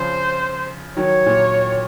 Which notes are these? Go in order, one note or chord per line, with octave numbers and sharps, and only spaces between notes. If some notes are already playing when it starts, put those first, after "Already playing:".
Already playing: C#3 F3 C5
D#3 F#3 C#5
A#2